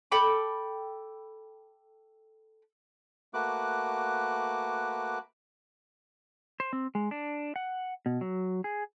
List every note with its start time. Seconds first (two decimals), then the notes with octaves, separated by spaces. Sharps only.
0.12 A4 G5 B5 D6
3.34 A3 A#3 F#4 B4 D6 F#6
6.60 C5
6.73 C4
6.95 G#3
7.11 D4
7.56 F#5
8.06 B2
8.21 F#3
8.64 G#4